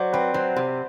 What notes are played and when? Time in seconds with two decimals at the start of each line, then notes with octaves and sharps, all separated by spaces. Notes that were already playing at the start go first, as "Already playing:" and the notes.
Already playing: F#3 C5 D5
0.13 C4 B4
0.34 F#3 C5
0.57 C3